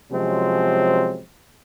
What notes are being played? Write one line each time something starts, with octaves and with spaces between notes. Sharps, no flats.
C3 F3 F#3 G#3 C4 C#4